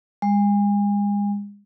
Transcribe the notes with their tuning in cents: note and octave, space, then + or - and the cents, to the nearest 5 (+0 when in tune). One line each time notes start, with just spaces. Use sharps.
G#3 -35